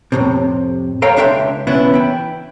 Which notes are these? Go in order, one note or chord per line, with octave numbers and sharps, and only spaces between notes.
F2 A2 C3
A4 C#5 F5 G5 A#5
C#2 D4 E5 G5 C6
C#3 E3 B3 C#4 D4 E4
G5 B5